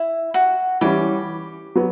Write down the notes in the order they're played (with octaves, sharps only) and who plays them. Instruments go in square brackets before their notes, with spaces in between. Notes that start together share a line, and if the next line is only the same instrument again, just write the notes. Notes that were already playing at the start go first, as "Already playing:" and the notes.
Already playing: [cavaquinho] E4
F#4
[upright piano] E3 G3 C#4 [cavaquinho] G4
[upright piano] F#3 B3